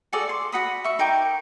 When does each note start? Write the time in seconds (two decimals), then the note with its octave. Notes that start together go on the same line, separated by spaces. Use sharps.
0.13 F#4 G#4 A4 D5
0.29 C6
0.52 F#4 F#5 B5 D#6
0.84 E5 C#6
0.99 D#4 A#4 G5 D6